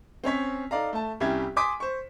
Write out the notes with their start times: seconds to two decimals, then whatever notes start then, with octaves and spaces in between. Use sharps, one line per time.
0.24 C4 C#4 C#5 B6
0.71 D#4 A4 D5 F5 A#5
0.93 A3 A5
1.20 C2 G3 C#4 E4 G4 G#6
1.56 G#5 C6 D6 D#6 B6
1.80 C5 C#6